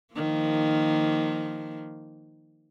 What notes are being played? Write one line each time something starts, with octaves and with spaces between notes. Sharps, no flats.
D#3 F3 A#3